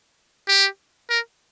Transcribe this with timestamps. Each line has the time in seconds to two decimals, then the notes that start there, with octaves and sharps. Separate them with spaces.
0.48 G4
1.10 A#4